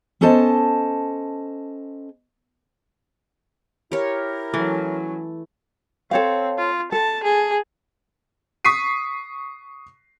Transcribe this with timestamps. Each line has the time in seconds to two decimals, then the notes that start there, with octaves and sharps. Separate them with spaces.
0.21 B3 C#4 A4 C5 D#5 A5
3.92 E4 G4 A#4 C#5
4.54 E3 F#3 A3 C#4
6.11 C4 A4 C#5 F5
6.58 F4
6.92 A4 A5
7.24 G#4
8.65 C#6 D#6 B6 C7 D#7